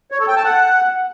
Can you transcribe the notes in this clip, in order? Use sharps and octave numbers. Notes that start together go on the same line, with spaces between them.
C#5
A4
G5
A5
F#5